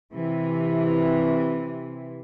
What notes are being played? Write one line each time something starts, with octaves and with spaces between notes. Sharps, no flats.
C3 E3